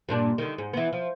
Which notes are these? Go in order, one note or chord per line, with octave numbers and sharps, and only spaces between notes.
G2 A#2 D4
D3 D#3
G#2
E3 B3
F3